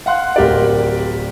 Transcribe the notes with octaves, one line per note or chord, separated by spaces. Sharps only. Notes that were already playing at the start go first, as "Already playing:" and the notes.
F5 F#5 C6 F#6
D1 G4 A#4 D5